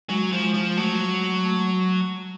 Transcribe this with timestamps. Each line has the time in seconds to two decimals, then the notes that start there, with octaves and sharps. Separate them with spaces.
0.09 F#3 G#3
0.32 F3
0.43 G#3
0.54 F3
0.77 F#3 A3
1.45 A3